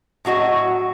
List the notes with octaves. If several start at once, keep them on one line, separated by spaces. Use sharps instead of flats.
A2 F#3 F#4 D#5